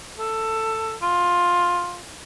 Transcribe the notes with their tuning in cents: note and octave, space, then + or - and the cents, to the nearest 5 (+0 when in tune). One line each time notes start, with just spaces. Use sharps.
A4 +15
F4 +10